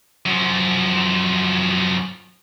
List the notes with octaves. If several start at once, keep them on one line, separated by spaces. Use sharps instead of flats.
F#2 F3